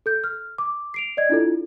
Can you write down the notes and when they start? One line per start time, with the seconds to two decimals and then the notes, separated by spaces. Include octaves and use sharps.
0.06 A4 G6
0.24 F6
0.58 D6
0.94 C7 D7 F7
1.17 D5 D#5 G#6
1.29 D4 E4 F4 A4